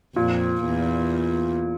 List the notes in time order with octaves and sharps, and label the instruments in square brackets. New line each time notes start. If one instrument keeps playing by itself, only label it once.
[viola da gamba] F2 [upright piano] A#2
[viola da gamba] E2